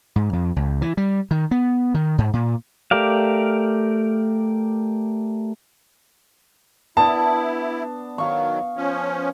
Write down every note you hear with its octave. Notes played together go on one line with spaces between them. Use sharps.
G#2
F2
C#2
E3
G3
D#3
B3
D#3
G#2
A#2
A3 G4 A#4 D5 F5
B3 D4 E4 A5
D#3 F#3 F5 C#6
F3 C#4